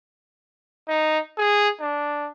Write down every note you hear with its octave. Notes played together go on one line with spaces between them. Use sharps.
D#4
G#4
D4